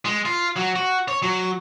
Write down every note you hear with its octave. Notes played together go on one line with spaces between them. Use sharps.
G#3
F4
F#3
F#4
C#5
F#3